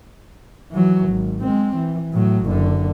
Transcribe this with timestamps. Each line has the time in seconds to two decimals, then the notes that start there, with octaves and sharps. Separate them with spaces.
0.71 E3 F#3
1.09 G#1
1.41 G#3 C4
1.76 E3
2.14 A2 F#3
2.46 F#1 D3